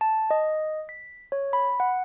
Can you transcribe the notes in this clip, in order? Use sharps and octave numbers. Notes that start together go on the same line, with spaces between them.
A5
D#5
B6
C#5
B5
F#5